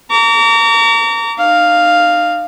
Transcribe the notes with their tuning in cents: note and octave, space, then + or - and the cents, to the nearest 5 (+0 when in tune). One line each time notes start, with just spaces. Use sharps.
A#5 -25 D6 -45
D#4 -35 F5 +0